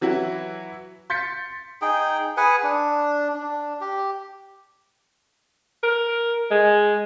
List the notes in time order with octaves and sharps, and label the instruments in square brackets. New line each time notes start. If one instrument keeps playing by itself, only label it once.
[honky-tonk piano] E3 F#3 E4 F#4
C6 G6 A6 B6 C#7
[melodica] D#4 G#4 G5
G#4 B4 F#5 G#5
D4
D4
G4
[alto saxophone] A#4
G#3